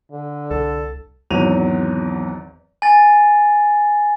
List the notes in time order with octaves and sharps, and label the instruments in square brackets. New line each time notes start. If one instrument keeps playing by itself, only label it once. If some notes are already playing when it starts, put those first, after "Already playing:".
[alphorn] D3
[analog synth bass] C2 [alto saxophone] A4
[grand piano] G#1 E2 F#3 D#7 F7
[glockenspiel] G#5 A6